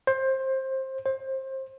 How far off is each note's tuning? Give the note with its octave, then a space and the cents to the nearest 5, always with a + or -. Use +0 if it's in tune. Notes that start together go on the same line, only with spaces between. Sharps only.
C5 +20
C5 +25